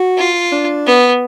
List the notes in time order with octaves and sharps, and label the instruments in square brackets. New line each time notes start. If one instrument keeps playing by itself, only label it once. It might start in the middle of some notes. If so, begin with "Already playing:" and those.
Already playing: [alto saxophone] F#4
[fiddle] F4
[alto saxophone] D4
[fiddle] B3